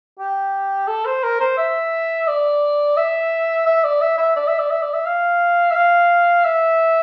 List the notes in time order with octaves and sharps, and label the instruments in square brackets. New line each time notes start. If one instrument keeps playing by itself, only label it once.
[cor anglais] G4
A4
C5
A#4
C5
E5
D5
E5
E5
D5
E5
E5
D5
E5
D5
E5
D5
E5
F5
E5
F5
E5